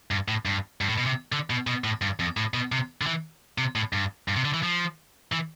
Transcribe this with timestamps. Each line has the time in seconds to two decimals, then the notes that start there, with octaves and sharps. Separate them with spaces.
0.11 G2
0.28 A2
0.46 G2
0.81 G2
0.88 A2
0.98 B2
1.06 C3
1.32 D3
1.50 B2
1.67 B2
1.84 A2
2.02 G2
2.20 F2
2.37 A2
2.54 B2
2.72 C3
3.02 D3
3.07 E3
3.58 C3
3.76 A2
3.93 G2
4.28 G2
4.36 C3
4.45 D3
4.54 E3
4.63 F3
5.32 E3